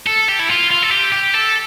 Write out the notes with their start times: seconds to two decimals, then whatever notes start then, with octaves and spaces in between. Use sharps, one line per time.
0.07 A4
0.29 G4
0.39 E4
0.50 F4
0.71 F4
0.82 A4
0.91 G4
1.12 G4
1.34 A4